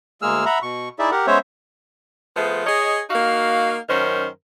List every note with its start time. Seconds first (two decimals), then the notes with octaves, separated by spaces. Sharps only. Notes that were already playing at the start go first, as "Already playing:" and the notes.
0.22 D2 G#3 A#3 G#4 E6 F6
0.46 E5 F#5 A#5 B5
0.62 B2 C#6
0.99 D#4 E4 G#4 D5 E5
1.11 G4 A#4 F#5
1.27 G#3 B3 C#4 C5 C#5 E5
2.36 F3 A3 B3 G#4 C5
2.66 G#4 C#5 D#5
3.10 A#3 D#4 F#4 F5
3.88 F#2 D#3 C#4 A#4 C5